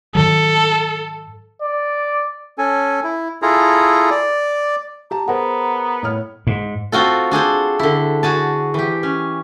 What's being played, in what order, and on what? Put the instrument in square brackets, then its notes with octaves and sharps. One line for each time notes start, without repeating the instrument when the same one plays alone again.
[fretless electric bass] G#2 D#3 F#3 [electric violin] A4
[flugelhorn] D5
[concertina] C#4 A4 G#5
E4
E4 F4 G#4 A4 A#5
D5
[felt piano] G4 A5 [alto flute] A#5
[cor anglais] B3 [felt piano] G#4 A#4 C5 [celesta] F#5
[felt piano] A2 C#5 F6
[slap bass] G#2
[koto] C4 F4 F#4 A4
D4 G#4 A4 C5
D3 E4
F#4 G#4 A5
E3 G4
C#4